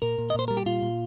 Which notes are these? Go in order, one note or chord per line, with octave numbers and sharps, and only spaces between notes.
A#2 A#4
A#2
D#5
A#2 C5
G3 A#4
G4
A#2 F4
A#2